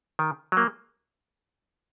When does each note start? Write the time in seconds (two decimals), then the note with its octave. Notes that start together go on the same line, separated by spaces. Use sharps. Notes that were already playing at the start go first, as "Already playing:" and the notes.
0.19 D#3
0.52 F#3 A#3